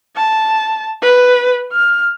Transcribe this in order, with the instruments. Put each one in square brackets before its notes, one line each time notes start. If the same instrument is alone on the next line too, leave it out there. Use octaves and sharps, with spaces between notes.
[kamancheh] A5
B4
F6